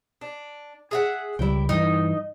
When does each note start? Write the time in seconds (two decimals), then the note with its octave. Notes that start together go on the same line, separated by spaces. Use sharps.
0.21 D4
0.91 G#4 E5 F#5
1.39 C#2 F3 G3 E4 G5
1.69 G2 E3 D#4